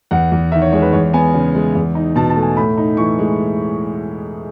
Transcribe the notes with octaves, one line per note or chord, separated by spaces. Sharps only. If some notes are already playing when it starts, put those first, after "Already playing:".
E2 F#5
E2
D#3 E5
C#5
G#3 C#5
B4
E2 C#5
B3 G#5
C#3
G#3
E2
D#4
B2 A5
A5
A3
G#5
A2 B5
D#4
E3 C#6
G#3